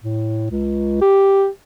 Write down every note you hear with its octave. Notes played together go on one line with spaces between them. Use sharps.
A2
C#2
G4